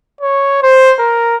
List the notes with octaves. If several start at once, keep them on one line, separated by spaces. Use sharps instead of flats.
C#5
C5
A#4